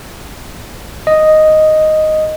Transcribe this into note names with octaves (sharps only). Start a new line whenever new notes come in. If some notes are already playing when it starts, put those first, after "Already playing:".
D#5